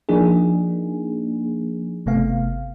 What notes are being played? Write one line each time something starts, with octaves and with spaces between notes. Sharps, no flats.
F3 A#3 D4 D#4 G#4
G1 C3 A3 B3 F5